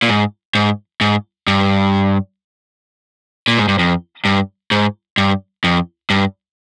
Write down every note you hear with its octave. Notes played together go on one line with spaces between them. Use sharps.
A#2
G#2
G#2
G#2
G2
A#2
G#2
G2
F2
G2
G#2
G2
F2
G2